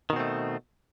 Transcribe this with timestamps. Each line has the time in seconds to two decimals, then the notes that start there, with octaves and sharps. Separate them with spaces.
0.10 D#3
0.13 B2
0.16 C4
0.19 A3